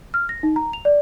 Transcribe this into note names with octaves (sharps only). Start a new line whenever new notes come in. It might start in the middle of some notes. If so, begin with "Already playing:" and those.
F6
A#6
D#4
A#5
F7
D5